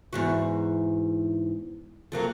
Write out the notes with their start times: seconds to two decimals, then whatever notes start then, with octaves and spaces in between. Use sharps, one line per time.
0.13 E2 G#2 F#4
2.12 F2 F#3 A#3